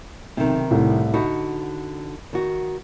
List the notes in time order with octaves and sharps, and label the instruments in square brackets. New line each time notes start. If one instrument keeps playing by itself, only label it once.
[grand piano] B1 [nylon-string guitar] C3 D#3
[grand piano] C2 A2
[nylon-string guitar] D3 D#4 F#4 [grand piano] B5
[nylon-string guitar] D#3 F#4